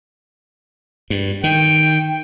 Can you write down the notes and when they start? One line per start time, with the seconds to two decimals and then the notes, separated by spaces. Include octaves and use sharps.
1.10 G2
1.44 D#3 G5